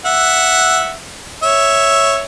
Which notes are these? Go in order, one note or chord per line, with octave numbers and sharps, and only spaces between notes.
E5 F#5
C#5 E5